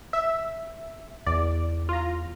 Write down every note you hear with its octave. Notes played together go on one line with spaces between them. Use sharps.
E5
E2 D5
F4 A#5